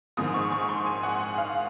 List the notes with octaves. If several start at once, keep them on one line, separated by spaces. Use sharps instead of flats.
A#1 G#2 D#3 D#6
C#6
C#6
C6
G#5
F#5
F#5
F5